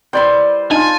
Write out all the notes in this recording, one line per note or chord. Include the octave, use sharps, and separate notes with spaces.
G3 E4 B4 C5 D5 G5
D#4 F4 G#5 A5